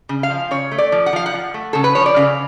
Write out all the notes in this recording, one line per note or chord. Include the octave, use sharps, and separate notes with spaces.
C#3
F5
F3
C#3 C#5
A3
D5
F3
F#5
F3 F5
F#5
F3
A3
C#3 A4
B4
F3 C#5
D5
C#3 F5